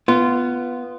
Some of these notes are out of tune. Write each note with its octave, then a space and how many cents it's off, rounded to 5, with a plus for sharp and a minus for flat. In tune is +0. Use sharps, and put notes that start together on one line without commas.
B3 +0 F4 -15